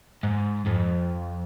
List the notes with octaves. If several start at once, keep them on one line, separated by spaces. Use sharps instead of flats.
G#2
F2